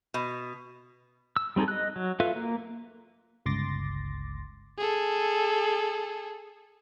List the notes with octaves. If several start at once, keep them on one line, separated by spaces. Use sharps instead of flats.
B2
E6
G3 C4 D#4 G#4 A4
D#5 F#6
F#3
F4 A4 B4 E5 F5
A#3
G1 C#2 C6 D6 A6 A#6
G#4 A4